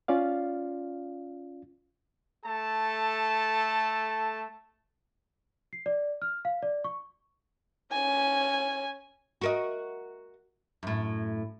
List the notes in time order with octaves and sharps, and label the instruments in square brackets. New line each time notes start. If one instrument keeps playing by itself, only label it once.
[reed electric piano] C#4 F4 D5 F5
[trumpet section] A3 A4 A5
[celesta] C7
D5
F6
F5
D5
C#6
[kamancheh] C#4 G#5
[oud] F#4 A#4 D#5
F#2 A2